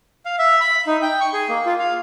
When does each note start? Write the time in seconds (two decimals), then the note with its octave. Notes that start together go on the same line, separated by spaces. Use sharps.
0.25 F5
0.39 E5
0.60 B5
0.87 D#4
1.02 G5
1.20 C#6
1.33 G#4
1.49 A#3
1.66 F4
1.79 F5